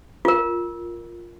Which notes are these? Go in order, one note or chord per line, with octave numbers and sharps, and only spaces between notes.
F4 A#4